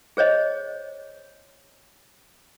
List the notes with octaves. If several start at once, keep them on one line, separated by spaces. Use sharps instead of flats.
G#4 C5 C#5 D#5